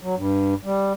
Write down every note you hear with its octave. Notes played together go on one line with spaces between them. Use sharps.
F#3
G2
G3